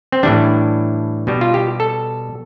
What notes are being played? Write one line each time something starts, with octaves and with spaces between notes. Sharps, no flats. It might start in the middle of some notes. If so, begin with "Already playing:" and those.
C4
A2 E3 G3 D4
B2 G3
F4
G4
A4